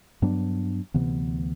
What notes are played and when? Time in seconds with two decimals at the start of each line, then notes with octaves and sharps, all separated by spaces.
0.22 G2 F#3 B3 D4
0.94 D2 C3 E3 B3